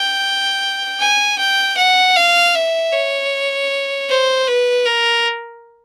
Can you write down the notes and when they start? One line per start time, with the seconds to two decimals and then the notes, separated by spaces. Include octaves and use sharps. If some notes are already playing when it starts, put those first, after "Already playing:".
Already playing: G5
0.99 G#5
1.38 G5
1.76 F#5
2.16 F5
2.55 E5
2.92 C#5
4.09 C5
4.47 B4
4.85 A#4